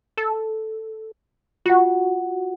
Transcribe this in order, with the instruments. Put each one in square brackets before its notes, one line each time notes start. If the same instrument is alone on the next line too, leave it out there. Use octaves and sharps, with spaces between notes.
[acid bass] A4
[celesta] F4 F#5 [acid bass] F#4